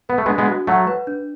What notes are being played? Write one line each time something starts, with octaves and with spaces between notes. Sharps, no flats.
B3 B4
A3
G#3 B3 D4
G#3 B3
F#4
F#3 A3 F#5
B4
D4